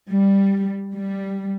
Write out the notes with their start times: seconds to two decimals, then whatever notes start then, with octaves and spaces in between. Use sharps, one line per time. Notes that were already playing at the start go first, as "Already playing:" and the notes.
0.11 G3
0.95 G3